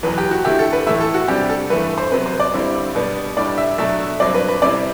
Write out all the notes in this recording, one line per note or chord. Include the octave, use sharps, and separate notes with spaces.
E2 B2 F#3 B4
G4
F#4
D3 A3 E4 G4
A4
B4
A2 E3 A3 E4 E5
A4
F#4
C3 G3 D4 G4
A4
G2 E3 A3 B4
C5
C3 F#3 B3 B4
C5
D5
G2 D3 G3 C4 E4
B2 G3 B3 D4
A2 G3 D4 D5
E5
B2 F#3 A3 D4 E5
G2 F#3 C4 D5
B4
B4
C3 G3 C4 E4 D5